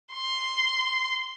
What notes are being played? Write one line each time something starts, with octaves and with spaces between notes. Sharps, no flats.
C6